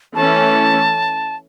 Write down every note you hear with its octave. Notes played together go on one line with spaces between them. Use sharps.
E3 A3 C#4 A5